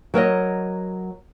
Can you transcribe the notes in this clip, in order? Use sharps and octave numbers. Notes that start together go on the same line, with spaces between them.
F#3 A#4 C#5 D#5